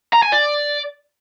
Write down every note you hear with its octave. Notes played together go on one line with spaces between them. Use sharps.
A#5
G#5
D5